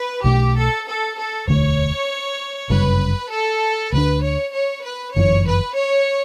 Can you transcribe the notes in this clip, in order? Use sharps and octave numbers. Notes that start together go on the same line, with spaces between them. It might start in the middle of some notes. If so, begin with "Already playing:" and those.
Already playing: B4
B1 B2 A3 G4
A4
A4
A4
E1 D2 D3 A3 C#5
G1 F#2 C#3 G3 B4
A4
D2 D3 A3 D4 B4
C#5
C#5
B4
G1 F#2 E3 C#5
B4
C#5